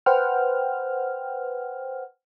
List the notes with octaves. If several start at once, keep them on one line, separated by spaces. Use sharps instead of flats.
B4 C5 F#5 G5 F6